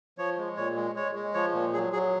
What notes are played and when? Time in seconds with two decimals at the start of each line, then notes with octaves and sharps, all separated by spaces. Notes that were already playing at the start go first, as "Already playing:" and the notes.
0.18 F3 C#5
0.38 G#3
0.57 A#2 C#5
0.76 G#3
0.96 G#3 C#5
1.15 G#3
1.34 F3 C#5
1.54 A#2
1.73 F#3 G#4
1.93 F#3 G#4